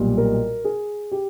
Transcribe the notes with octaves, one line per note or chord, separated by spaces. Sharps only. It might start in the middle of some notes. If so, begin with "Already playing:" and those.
Already playing: B1 A#2 G3
A#4
G#4
G4